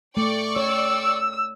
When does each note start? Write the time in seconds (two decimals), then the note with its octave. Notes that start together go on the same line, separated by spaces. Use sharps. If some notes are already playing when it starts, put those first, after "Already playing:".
0.17 A3 D5 G5 C#6
0.56 C#5 E6